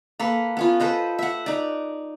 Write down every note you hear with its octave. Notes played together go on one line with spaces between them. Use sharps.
A#3 A4 B4
B3 C#4 F4
A4 B4 C5 D#5
E5 F#5
D#4 D5